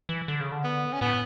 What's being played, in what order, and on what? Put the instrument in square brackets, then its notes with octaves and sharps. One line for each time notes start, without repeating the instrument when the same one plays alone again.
[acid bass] E3
D3
C#3
D3
[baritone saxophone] B3
C#4
[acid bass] A2 [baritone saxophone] B3